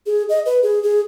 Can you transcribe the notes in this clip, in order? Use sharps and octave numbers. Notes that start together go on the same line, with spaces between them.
G#4
D#5
B4
G#4
G#4